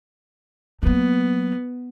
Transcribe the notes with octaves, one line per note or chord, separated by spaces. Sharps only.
F#3 A#3 B3